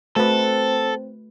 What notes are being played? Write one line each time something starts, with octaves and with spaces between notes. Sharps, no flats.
A3 C4 F#4 A4 B4